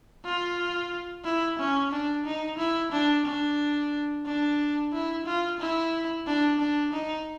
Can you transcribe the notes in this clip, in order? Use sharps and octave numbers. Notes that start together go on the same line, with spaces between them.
F4
E4
C#4
D4
D#4
E4
D4
D4
D4
E4
F4
E4
D4
D4
D#4